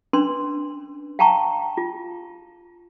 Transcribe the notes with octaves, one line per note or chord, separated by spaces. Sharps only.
C#4 D4 B4 C6
F5 G5 A5 A#5 C#6
F4